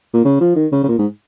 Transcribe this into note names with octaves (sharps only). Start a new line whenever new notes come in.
A#2
C#3
F3
D#3
C#3
C#3
A#2
G#2